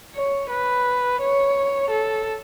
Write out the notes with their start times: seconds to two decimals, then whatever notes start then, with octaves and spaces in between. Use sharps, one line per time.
0.15 C#5
0.50 B4
1.21 C#5
1.90 A4